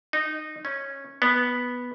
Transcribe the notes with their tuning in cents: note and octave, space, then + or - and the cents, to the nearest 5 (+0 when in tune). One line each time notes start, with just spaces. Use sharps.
D#4 -15
C#4 -10
B3 -5